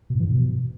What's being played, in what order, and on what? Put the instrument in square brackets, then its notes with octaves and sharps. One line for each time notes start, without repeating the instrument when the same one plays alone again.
[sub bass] B2
G#2
E3
G2
B2